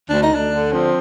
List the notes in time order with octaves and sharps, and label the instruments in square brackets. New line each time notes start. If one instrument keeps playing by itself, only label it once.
[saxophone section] D2 [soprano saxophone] D4
[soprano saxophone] D#4
[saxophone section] D2 [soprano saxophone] D4
[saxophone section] D3
[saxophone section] F3 [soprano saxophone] C4